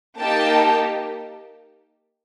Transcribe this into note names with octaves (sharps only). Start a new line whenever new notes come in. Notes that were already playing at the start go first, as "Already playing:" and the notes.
A#3 D#4 G4 G5 A5